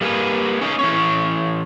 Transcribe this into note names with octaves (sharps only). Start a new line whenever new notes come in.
G3 A#3 G#4 B4
C#4 D#4 G#4 D#5
E3 C#4 C#5